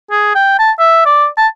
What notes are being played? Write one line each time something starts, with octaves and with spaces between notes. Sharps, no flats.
G#4
G5
A5
E5
D5
A5